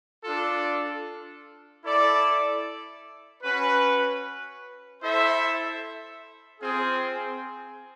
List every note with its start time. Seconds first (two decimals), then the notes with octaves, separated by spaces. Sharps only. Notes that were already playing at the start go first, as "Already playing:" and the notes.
0.23 D4 F4 A4
1.83 E4 A4 D5
3.42 C#4 F#4 B4
5.01 E4 A4 C5 E5
6.60 C4 F4 G#4